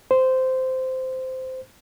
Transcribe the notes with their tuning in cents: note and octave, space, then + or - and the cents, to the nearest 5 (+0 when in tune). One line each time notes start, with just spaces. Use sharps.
C5 -15